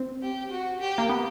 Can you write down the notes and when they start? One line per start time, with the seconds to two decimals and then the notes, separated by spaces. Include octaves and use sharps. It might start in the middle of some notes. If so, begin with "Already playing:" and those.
Already playing: C4
0.22 G4
0.51 F#4
0.80 G4
0.98 A#3
1.09 B3